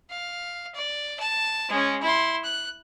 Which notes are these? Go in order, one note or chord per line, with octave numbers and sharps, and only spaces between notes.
F5
D5
A5
G#3 C#4
E4 C6
F#6